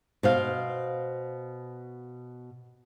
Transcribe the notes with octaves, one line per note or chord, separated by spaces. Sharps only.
B2 C5 F5